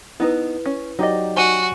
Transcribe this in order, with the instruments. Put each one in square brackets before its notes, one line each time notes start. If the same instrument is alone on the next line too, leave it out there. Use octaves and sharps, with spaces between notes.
[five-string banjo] B3 D#4 [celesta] E4 B4
[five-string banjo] C#4
[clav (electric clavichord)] F#3 G4 D5 [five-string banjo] D#4 D#5
[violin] F#4 [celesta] G#5 C#6 D#7